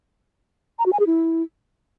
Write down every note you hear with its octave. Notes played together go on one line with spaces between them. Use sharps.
A#5
F#4
G#5
G#4
E4